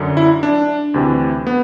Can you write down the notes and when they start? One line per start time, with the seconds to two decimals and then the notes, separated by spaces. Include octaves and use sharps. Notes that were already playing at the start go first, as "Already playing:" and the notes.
Already playing: F#2 D3
0.17 E4
0.43 D4
0.94 D2 C3 E3
1.47 B3